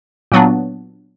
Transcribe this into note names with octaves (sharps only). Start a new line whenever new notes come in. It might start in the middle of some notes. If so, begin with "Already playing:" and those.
A#2 F#3 B3 D4